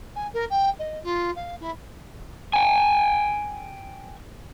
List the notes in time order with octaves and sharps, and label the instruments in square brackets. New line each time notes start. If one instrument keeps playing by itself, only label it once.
[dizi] G#5
A#4
G5
D#5
F4
F5
E4
[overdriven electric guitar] G5 G#5